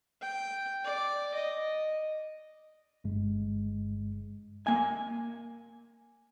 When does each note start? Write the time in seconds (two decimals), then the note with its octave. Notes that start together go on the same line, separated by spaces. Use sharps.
0.21 G5
0.84 D5
1.34 D#5
3.04 G1 G2 G#3
4.67 A#3 G#5